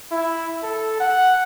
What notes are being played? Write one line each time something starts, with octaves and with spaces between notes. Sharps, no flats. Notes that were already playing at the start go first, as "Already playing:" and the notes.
E4
A4
F#5